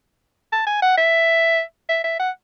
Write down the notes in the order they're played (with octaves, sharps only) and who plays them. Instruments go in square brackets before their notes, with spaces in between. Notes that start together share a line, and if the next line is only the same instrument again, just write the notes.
[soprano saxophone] A5
G#5
F#5
E5
E5
E5
F#5